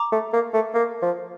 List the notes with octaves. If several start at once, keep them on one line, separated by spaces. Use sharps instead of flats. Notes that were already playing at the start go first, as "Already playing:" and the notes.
Already playing: A#5 D6
A3
A#3
A3
A#3
F3